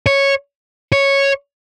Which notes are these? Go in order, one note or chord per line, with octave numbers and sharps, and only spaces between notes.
C#5
C#5